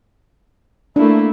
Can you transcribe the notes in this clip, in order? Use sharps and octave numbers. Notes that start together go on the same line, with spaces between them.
A3 A#3 D4 E4